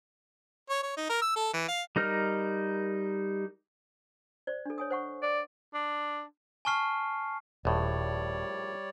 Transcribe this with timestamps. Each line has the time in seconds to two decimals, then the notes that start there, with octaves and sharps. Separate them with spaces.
0.70 C#5
0.83 C#5
0.97 D#4
1.10 A#4
1.22 E6
1.36 A4
1.54 E3
1.68 F5
1.96 G3 D#4 A#4 F6
4.47 C5 D5
4.66 D4 A4
4.78 C#5 G#5 D#6
4.90 C5 F#5 C#6
5.23 D5
5.74 D4
6.65 G#5 A5 C#6 F6 C7
7.65 D#1 A#1 A2 G3 C#5 D5